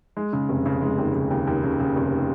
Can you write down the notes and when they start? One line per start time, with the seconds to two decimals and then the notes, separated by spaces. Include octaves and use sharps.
0.17 G#3
0.33 C#3
0.49 F1
0.66 C#3
0.82 G#3
0.98 D#2
1.15 C#3
1.30 D#2
1.47 D#2
1.63 C#3
1.80 C#3
1.96 F1